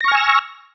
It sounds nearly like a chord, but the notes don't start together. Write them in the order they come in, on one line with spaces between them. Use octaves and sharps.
A#6 C#6 F6 G#5 E6